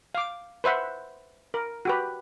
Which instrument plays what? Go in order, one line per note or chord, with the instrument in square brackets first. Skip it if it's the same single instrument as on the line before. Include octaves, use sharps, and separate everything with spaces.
[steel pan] F5 D6
B4 C5 E5 F#5
A#4
F#4 G4 B4